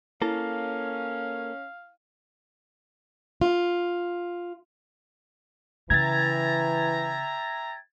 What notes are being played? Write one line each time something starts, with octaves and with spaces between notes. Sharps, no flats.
A#3 C#4 E4 A4 F5
F4
C#3 E3 E5 G5 A#5 G#6 A6